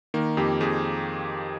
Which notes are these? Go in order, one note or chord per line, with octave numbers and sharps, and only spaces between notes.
D#3 A#3
F2 G4
F2 G#4